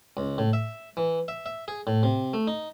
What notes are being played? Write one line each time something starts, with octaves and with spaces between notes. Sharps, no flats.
C#2
A2
E5
E3
E5
E5
G#4
A2
C3
A3
D#4